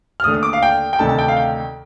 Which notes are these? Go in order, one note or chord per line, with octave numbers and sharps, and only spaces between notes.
F6
D#2 D3 A3 D4 D#6
D#6
D6
F5
G5
G5
D2 C3 D#3 A3 D4 A5
A5
G5
F5
G5